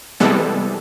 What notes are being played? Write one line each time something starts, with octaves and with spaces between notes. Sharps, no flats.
C3 E3 G3 G#3 B3 A4